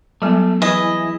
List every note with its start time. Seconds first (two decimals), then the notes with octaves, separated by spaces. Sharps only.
0.22 F#3 G3 A3 B3
0.62 E3 E4 G#4 B4 D#5